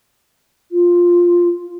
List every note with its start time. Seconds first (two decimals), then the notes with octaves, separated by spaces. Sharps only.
0.72 F4